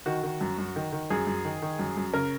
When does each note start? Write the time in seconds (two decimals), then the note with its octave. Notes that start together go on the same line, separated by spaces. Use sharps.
0.06 D#3 F#4
0.23 D#3
0.41 F#2
0.58 F#2
0.76 D#3
0.92 D#3
1.10 F#2 G#4
1.27 F#2
1.45 D#3
1.62 D#3
1.79 F#2
1.97 F#2
2.14 C#3 A#4